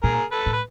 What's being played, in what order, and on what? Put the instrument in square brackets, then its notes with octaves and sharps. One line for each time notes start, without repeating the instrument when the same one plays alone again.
[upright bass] A#2 [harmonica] G#4 A#4
[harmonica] A4 B4
[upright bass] A2
[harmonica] B4